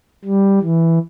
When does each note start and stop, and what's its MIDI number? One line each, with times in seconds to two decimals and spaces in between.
0.25 0.59 55
0.62 0.99 52